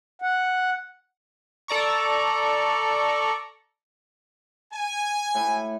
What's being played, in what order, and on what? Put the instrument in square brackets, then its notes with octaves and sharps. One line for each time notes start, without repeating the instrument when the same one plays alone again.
[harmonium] F#5
[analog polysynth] A4 D5 A#5 C#6
[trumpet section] G#5
[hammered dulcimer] A2 B5